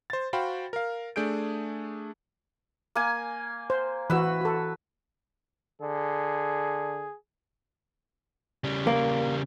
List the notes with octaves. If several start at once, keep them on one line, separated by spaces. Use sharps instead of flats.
C5 A6
F#4 C5 F5 G5 B5
A#4 F5
A3 D4 G#4 G6 D7
A#3 G#5
C5
E3 F#4 B4 E6
F#4 A4
D3 G#4
C#3 G3
A#3